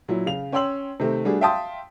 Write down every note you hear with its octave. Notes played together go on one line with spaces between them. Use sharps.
A#2 F#3 E4
C#3 F5 F7
C#4 C#5 G5 C6 E6 F#7
C3 D#3 A3 C4
G3 A3 D4 F#4 G#4
E5 F5 G5 A5 C6 D#6